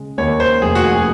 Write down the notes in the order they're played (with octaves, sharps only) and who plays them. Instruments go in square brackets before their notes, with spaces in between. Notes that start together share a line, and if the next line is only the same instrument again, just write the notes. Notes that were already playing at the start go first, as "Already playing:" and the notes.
Already playing: [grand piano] C#3 G#3
[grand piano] D#2 [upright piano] C#5
[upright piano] C5
[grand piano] F1 [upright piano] G#4
[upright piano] F#4
G#4